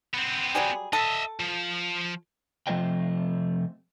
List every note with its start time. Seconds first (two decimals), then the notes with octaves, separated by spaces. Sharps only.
0.14 B3 C4
0.55 F#3 G3 G#4
0.93 A4 D#5 E5
1.40 F3
2.67 C3 F3 A3 C5 D#5 G5